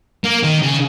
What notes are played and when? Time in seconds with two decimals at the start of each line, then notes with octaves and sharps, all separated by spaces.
0.24 A#3
0.43 D#3
0.62 C#3